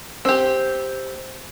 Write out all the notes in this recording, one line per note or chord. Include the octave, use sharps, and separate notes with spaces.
C4 G4